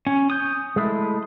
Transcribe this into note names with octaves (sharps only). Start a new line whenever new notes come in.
C#4
D#6 G6
G#3 A3 E4